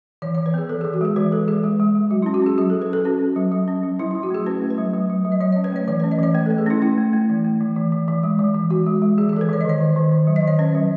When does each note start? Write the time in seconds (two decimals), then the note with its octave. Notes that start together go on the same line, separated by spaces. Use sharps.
0.22 E3 C#5
0.35 C#5
0.38 E3
0.46 B4
0.54 B3 G#4
0.69 E3 A4
0.81 G#4
0.85 E3
0.94 F#4
1.01 G#3 G#4
1.16 E3 B4
1.32 G#3 A4
1.48 E3 G#4
1.64 G#3
1.80 G#3
1.95 G#3
2.11 F#3 F#4
2.22 E4
2.26 C#4
2.34 F#4
2.42 C#4 G#4
2.58 F#3 G#4
2.70 A4
2.74 F#3
2.82 B4
2.90 C#4 A4
3.05 C#4 F#4
3.21 C#4
3.36 F#3
3.52 F#3
3.68 C#4
3.83 F#3
3.99 F#3 E4
4.11 E4
4.15 F#3
4.23 F#4
4.30 A3 G#4
4.46 C#4 B4
4.62 A3
4.70 B4
4.78 F#3
4.94 F#3
5.10 F#3
5.25 F#3
5.32 D#5
5.41 F#3 C#5
5.52 C#5
5.56 C#4
5.64 B4
5.72 A3 C#5
5.88 E3 C#5
6.00 B4
6.04 C#4
6.12 D#5
6.19 E3 C#5
6.34 A3 B4
6.46 A4
6.51 A3
6.58 G#4
6.66 C#4 E4
6.82 A3 E4
6.98 A3
7.13 A3
7.29 E3
7.45 A3
7.60 E3
7.76 E3
7.92 E3
8.08 E3
8.23 G#3
8.39 E3
8.54 E3
8.70 E3 F#4
8.86 G#3
9.02 G#3
9.18 E3 G#4
9.29 G#4
9.33 E3 A4
9.41 B4
9.49 E3 C#5
9.61 D#5
9.65 D#3 C#5
9.80 D#3
9.96 D#3
10.12 D#3
10.27 F#3
10.36 D#5
10.43 D#3 C#5
10.59 C#4 B4
10.75 F#3